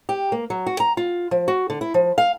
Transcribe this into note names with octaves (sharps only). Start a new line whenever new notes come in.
G4
A#3
F#3
F#4
A#5
F4
F3
F#4
D3
E4
F3
F5